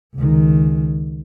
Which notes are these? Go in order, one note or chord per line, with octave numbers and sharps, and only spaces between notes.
C#2 D#3